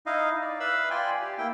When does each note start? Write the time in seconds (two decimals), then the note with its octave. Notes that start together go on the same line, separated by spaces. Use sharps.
0.06 D#4 E4 D#5 F5
0.42 D5
0.60 B4 E5 F5 B5 E6
0.90 F4 D5 G5 G#5 C6
1.21 G4
1.38 A#3 E4 G5